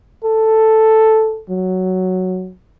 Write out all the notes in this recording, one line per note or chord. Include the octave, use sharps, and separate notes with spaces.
A4
F#3